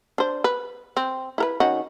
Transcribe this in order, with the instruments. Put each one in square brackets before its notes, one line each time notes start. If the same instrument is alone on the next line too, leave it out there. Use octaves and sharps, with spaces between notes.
[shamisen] D4 C5
B4
C4
E4 A#4 B4
D#3 C#4 F#4